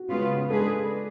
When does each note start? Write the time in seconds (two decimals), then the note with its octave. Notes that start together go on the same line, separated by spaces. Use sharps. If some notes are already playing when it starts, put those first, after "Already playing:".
Already playing: F#4
0.09 C#3 G#3 B3 F4 B4
0.50 G#3 D4 G#4 A4 B4